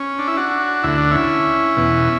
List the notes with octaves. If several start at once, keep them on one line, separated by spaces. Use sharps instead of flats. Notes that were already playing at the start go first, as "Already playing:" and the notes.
Already playing: C#4
D4
E4
D4 F#4
D2 D3 E4
D4
C#4 E4
E2 B2